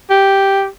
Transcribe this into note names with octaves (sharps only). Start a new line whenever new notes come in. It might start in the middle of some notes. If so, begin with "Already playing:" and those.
G4